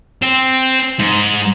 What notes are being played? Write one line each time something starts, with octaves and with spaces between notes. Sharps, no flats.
C4
G#2